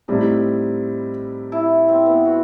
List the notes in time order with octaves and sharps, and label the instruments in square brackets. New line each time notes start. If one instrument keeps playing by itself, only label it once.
[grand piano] A2 G3 C4 E4 [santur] D#4
[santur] E4
C4
B3
F#4